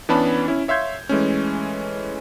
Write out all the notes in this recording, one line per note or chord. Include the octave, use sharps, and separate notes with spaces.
E3 B3 C#4 D4 A5 B5
C#4 E4
C#5 E5 F5 C6 G6 G#6
E3 G#3 A3 C#4